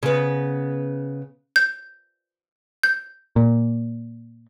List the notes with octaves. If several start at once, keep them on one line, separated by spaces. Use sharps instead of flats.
C#3 B3
G6
G6
A#2